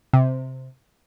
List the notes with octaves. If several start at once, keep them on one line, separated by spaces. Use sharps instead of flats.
C3